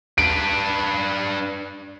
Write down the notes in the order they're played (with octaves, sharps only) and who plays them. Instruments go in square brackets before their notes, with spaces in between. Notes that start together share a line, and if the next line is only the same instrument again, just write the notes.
[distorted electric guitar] D4 B4 [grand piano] D7